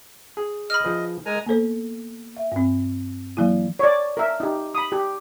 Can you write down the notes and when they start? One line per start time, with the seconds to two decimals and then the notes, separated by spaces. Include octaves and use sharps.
0.37 G#4
0.70 D#5 B5 F6
0.84 F3 G#4 B4
1.26 G#3 A#4 G#5 A#5
1.46 A#3 B3 A4 C5
2.37 E5
2.52 G2 C4
3.37 E3 F#3 A#3 E4
3.79 C#5 D5
4.17 A#4 E5
4.40 D#4 G4
4.75 B5 D#6
4.92 G4